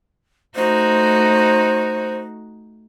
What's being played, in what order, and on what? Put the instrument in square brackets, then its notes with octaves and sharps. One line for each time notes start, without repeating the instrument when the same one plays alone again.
[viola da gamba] A3 D#4 F#4 [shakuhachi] C5